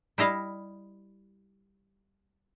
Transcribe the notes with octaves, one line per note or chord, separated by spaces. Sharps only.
G3 E4 D#5 F5